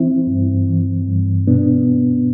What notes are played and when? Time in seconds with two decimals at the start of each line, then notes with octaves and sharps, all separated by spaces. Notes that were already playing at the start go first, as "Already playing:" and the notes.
Already playing: E3 C4 E4
0.27 G2
0.68 E3
1.08 G2
1.47 B2 B3 D4